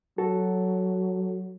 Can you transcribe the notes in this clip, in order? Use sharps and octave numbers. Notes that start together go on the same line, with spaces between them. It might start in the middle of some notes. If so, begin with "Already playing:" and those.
F#3 F#4 A4